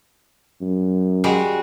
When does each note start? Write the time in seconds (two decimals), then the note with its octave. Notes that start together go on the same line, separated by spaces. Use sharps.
0.61 F#2
1.24 G3 G#3 F#4